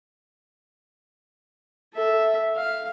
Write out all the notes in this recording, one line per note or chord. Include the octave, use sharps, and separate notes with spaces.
A4 E5
F5